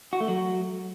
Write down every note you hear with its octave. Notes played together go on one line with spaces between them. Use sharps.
F#4
A3
F#3